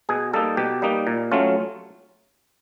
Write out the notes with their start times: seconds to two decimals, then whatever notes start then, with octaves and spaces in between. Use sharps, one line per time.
0.09 B2 G#4
0.34 G3 A#3 D#4 A4
0.57 B2 G4
0.82 G3 A#3 D#4
1.07 A#2
1.32 F#3 A3 C#4 F4